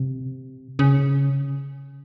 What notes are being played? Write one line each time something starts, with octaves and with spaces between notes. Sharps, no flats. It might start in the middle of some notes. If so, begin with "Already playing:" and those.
Already playing: C3
C#3